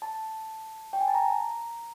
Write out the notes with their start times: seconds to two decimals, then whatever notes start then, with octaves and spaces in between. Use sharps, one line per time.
0.02 A5
0.93 G5
1.01 G#5
1.08 A5
1.14 A#5